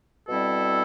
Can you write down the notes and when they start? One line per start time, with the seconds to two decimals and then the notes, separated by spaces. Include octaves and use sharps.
0.28 B2 G3 C4 E4 A4